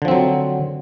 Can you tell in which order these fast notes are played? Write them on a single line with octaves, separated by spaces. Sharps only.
D3 F3 C4 F#3